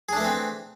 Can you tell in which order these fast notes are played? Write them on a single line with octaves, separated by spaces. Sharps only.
G#4 D4 A3 E3 C4